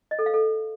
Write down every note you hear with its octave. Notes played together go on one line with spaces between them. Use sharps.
D#5
A4
F5
A4